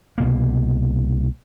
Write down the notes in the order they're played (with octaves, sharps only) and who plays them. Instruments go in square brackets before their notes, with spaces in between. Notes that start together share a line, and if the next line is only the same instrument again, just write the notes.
[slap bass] C2 B2 A#3